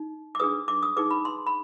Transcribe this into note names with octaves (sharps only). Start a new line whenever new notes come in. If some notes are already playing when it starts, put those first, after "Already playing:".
Already playing: D#4
D6
D4 G#4 B4 D#6
D6
D#6
D#4 G#4 B4 D6
B5
C6
B5